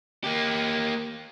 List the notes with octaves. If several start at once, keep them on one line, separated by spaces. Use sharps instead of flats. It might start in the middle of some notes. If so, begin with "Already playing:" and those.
A#3 G4